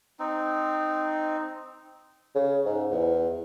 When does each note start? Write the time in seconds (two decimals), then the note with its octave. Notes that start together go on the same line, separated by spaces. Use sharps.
0.19 C4 D#4
2.35 C#3
2.65 G#2
2.92 E2